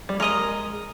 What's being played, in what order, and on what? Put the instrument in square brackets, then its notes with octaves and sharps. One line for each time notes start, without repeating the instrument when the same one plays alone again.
[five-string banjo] G3
[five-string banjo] G#3 [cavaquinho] A#4 D#5 A#5